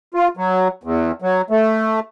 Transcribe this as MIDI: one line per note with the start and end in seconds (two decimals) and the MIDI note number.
0.14 0.28 65
0.37 0.68 54
0.84 1.12 40
1.22 1.42 54
1.50 2.00 57